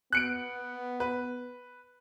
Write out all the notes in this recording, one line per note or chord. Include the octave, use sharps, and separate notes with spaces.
B3 F#6 C#7 D7
B4